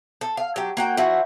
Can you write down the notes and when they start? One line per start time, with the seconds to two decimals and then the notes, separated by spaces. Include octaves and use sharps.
0.21 A4
0.37 F5
0.56 F#3 G4
0.77 A#3 F#4 G5
0.97 F3 E4 F#4